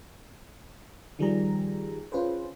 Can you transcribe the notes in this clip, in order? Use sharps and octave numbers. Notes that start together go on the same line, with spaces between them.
D#3 F3 G3 G4 G#4 A#5
C#4 F4 G#4 B4 C5